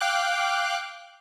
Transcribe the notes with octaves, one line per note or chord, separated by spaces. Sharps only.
F5 G5 D6 F#6